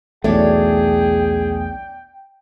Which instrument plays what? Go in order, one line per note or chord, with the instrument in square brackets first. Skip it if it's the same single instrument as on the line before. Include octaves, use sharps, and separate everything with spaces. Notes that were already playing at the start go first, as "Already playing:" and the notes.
[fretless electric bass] B1 E2 A3 [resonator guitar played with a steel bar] D4 C#5 [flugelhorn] G#4 [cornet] G5